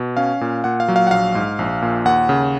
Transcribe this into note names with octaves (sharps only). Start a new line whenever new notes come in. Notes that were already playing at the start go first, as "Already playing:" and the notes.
Already playing: B2
C#4 F5
A#2
A#2 F#5
F5
F#3
F5
F#5
A#1 F5
G#2
A#1
A#2
D#2 F#5
C#3